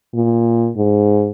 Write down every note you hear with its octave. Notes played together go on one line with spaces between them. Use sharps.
A#2
G#2